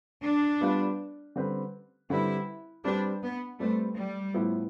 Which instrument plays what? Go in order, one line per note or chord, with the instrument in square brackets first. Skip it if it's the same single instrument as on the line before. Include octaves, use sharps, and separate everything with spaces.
[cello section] D4
[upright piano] G3 B3 F4 B4
D3 G3 C4 G4 B4
[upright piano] D3 G3 C4 G4 B4 [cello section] E4
[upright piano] G3 C4 G4 B4 [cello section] D4
[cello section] B3
[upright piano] G3 C4 G4 B4 [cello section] A3
[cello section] G3
[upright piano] A2 F3 B3 E4